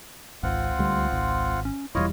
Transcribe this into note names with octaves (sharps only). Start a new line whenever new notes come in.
G#1 C#2 C4 F4 F#5
D2 G3
G#1
C#4
E1 E2 G3 E4 F4 C#5 D#5